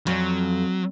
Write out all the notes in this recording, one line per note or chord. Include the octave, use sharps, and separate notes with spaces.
F2 F#3